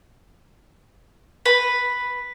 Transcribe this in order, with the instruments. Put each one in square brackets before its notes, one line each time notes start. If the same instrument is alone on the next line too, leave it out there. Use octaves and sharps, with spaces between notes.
[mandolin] B4 [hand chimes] B6